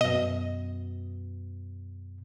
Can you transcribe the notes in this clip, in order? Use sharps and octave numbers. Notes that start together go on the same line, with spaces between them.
F#2 B2 D#5